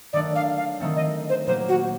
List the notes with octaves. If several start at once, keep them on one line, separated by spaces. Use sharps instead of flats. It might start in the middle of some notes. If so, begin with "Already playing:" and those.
D#3 F#3 A3 D4 D5
F5
F5
D#3 F#3 A3 C4
D#5
C5
A#2 F#3 A#3 C5
F#4